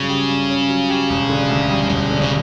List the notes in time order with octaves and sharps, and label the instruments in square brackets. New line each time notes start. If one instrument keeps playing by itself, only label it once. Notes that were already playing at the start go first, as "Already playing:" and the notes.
Already playing: [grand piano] G2 F#3 C#4 [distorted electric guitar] C#3
[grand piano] G4
G2
C#4
F#3
G4
E1
D3
D2
G3
[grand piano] E1 [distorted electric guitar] C#3
[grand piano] D3
[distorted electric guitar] C#3